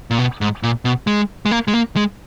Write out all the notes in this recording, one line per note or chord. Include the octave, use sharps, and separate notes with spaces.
A#2
B2
G#2
A#2
B2
G#3
G#3
A#3
G#3
A#3
G#3